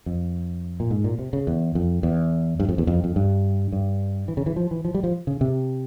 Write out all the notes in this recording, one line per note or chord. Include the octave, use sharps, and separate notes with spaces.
F2
A#2
G#2
A#2
C3
C#3
E2
F2
E2
G2
F2
E2
F2
F2
G2
G2
E3
C#3
E3
F3
E3
F3
G3
F3
C#3
C3